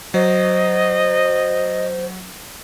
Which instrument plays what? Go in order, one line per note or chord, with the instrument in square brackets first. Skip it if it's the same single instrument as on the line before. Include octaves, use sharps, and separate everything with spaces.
[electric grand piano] F#3 [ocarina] C5 [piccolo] D#5